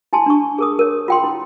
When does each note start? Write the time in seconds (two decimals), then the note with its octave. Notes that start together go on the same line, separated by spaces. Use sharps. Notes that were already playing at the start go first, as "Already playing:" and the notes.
0.13 E4 G#5 A5 C6
0.26 D4 C#6
0.58 G#4 A#4 D#6
0.79 A#4 C#5
1.08 F4 G5 C6
1.24 E4